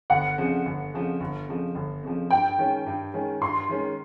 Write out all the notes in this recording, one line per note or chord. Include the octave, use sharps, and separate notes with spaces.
G1 F#5
F2 C#3 F3
G1
F2 C#3 F3
G1
F2 C#3 F3
G1
F2 C#3 F3
G2 G5
D#3 G#3 C#4
G2
D#3 G#3 C#4
G2 C6
D#3 G#3 C#4